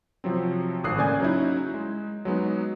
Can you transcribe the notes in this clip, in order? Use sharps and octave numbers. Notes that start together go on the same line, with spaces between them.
C3 F3 F#3 C4
G#1 A2 D#6 F#6 C7
C#3 A#3 D5 G#5 G6 G#6
F#3 C#4 D#4 E4
G#3
F#3 G#3 B3 D#4